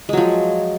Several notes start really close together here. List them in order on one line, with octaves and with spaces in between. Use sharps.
G#3 F#3 F3